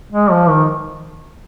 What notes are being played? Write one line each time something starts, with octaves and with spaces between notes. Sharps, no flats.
G#3
F3
D#3